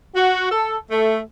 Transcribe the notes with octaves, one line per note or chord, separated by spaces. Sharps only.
F#4
A4
A3